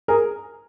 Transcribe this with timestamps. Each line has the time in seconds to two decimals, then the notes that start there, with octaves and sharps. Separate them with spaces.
0.08 G#4 A#4